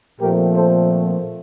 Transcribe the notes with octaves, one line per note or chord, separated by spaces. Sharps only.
A#2 F3 A3 C4 G4 A#4
A4 C5